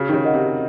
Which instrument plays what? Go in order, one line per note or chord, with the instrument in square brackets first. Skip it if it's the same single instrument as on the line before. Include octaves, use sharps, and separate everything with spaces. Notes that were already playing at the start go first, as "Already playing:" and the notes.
Already playing: [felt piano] C#3 [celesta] F#4
[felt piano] D#3
C#3
[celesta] A#4 D#5 F#5
[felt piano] C3